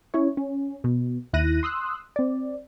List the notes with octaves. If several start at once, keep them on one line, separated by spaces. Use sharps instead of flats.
C#4 E4 C#5
C#4
B2
D#2 E4 F#6 A#6 D#7
C6 D#6 E6 F#6
C4 D5